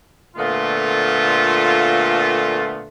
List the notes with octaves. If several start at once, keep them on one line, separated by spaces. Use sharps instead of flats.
A#2 D3 A3 B3 F4